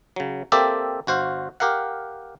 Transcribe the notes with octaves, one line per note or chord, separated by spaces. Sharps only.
C#3 F#3
A#3 C4 G4 A4 D5 E5
G1 F#4 C5 F5
G4 A#4 F5 F#5